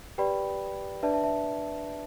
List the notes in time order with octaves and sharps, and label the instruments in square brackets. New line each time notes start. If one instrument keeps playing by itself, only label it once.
[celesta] G4 B4 D5 G5 B5
D4 B4 D5 E5 A5
E5 A5
E5 A5